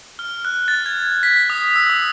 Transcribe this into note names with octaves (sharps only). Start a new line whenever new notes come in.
F6
F#6
A6
G#6
B6
D#6
E6
D#6